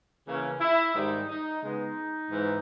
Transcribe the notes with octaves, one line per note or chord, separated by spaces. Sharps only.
C#3 E3 A#3 C#4
E4
G#2 D#3 G3 D#4
D#4
C#3 G#3 B3 D#4
G#2 E3